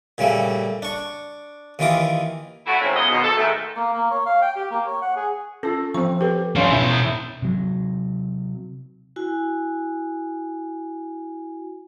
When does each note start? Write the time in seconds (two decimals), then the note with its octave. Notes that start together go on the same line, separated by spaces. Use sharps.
0.18 A#2 C#3 G3 A3
0.82 D4 C#6
1.79 D#2 D#3 E3 F4 D6 D#6
2.67 A3 E4 F#4
2.81 G#2 C3 D#3 C4 C#4 E4
2.96 F#3 B3 F4 G#4 D#5
3.09 D#2 B2
3.23 A4
3.37 G#2 D#3 A3
3.76 A#3
3.93 A#3
4.11 C#5
4.26 F5
4.42 G5
4.56 G4
4.71 A#3
4.86 C#5
5.02 F#5
5.16 G#4
5.63 C#4 F4 A4
5.94 F3 C4 C#6
6.21 G4 A4 B4
6.56 C#4 D4 F4 F5
6.70 B2 E4
7.42 C3 F#3
9.16 E4 F#4 G#5